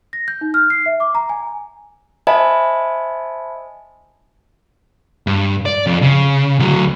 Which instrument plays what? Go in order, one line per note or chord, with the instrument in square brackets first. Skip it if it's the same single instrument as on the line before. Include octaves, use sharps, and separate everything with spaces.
[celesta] A#6
G6
D#4
F6
C7
E5
D6
A#5
G#5
[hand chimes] C5 D#5 E5 G#5 A5 B5
[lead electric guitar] G2
D5
F2
C#3
D2 F#3